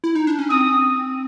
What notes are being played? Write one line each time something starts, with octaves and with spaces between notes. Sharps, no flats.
E4
D#4
D4
C#4
C4 D#6